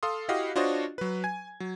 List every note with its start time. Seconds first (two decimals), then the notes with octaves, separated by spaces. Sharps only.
0.03 A4 F5 C6 D#6
0.28 E4 F#4 G4 D#5 F5 F#5
0.56 D4 F4 F#4 C5 C#5 D#5
0.98 F#3 B4
1.24 G#5 G#6
1.60 F#3